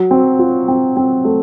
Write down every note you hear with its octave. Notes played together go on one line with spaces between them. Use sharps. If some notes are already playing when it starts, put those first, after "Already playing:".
Already playing: F#3
C4
F4
C4
C4
A3